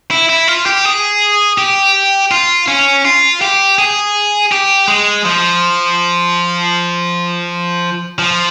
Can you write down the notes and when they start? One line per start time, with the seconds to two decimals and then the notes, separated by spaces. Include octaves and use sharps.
0.11 E4
0.29 E4
0.48 F4
0.66 G4
0.85 G#4
1.58 G4
2.31 F4
2.68 C#4
3.05 F4
3.41 G4
3.78 G#4
4.52 G4
4.88 G#3
5.25 F3
8.19 F3